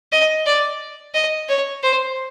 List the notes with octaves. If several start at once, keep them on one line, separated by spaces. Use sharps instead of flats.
D#5
D5
D#5
C#5
C5